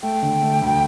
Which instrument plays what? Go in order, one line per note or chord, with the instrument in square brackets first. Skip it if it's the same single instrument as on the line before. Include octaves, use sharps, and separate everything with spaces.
[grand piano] A3 [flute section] G5
[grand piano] D3
A3
D2